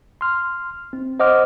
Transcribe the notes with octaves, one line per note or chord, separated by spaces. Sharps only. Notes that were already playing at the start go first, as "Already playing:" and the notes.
C6 F6
C4
C5 D#5 F#5 D6 F6